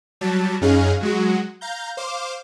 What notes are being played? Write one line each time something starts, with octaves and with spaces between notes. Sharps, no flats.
F#3 G3 A5
F#2 C#4 D#4 G#4 F5 F6
F#3 G#3 F#4
F5 A#5 G6
C5 F5 D6